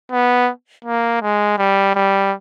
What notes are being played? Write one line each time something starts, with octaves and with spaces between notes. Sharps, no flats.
B3
A#3
G#3
G3
G3